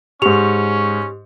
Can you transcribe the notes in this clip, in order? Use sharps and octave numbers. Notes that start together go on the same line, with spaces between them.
G#2 C#4 G4 C#6 F7